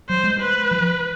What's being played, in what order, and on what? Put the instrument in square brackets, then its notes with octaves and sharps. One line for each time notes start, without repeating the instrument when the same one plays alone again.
[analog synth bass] F#3 [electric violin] C5
[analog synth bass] G#3
[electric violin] B4
[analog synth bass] F3